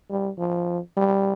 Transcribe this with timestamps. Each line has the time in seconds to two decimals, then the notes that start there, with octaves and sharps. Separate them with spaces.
0.10 G3
0.38 F3
0.97 G3